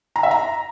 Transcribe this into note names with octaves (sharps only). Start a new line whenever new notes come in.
A#5
E5
A#5